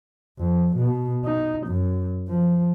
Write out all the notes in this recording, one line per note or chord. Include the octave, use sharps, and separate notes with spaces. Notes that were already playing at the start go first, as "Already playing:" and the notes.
F2
B2
D#4
F#2
F3